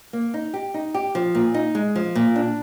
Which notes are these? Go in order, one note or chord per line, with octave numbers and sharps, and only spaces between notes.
A#3
D#4
G4
D#4
G4
F3
A#2
D#4
G#3
F3
A#2
D4